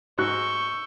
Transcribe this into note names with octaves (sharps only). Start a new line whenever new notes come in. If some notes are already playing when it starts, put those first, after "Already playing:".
G#2 F#4 C#6 E6 F#6 G6